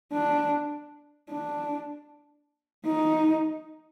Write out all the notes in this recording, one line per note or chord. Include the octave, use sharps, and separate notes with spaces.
D4
D4
D#4